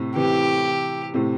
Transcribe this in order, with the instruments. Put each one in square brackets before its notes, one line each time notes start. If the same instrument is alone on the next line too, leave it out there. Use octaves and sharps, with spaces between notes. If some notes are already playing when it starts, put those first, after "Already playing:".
Already playing: [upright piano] A2 C3
[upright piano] C3 E3 [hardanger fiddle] G4
[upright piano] A2 C3